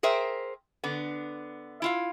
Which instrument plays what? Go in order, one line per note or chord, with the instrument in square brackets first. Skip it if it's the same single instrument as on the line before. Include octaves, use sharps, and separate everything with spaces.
[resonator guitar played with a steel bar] G#4 A#4 C5 E5 G5
D3 B3
E4 F4 F5